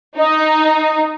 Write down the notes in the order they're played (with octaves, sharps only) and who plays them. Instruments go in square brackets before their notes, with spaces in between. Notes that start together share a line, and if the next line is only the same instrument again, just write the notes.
[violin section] D#4 [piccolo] D#5